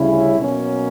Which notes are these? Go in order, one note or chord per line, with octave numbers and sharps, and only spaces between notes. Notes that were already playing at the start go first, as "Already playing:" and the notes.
Already playing: D2 C#3 G3 C#4 E4
B2 F#3 A#3 C#4